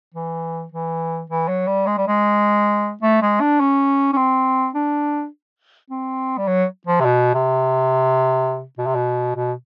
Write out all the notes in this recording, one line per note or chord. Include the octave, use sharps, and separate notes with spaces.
E3
E3
E3
F#3
G3
G#3
G3
G#3
A3
G#3
D4
C#4
C#4
C4
D4
C4
G3
F#3
F3
C3
B2
C3
B2
C3
B2
B2